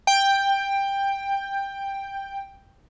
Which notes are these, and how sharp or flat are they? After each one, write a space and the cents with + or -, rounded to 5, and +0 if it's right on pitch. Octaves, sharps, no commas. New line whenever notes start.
G5 +10